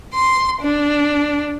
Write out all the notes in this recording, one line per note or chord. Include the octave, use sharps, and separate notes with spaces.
C6
D4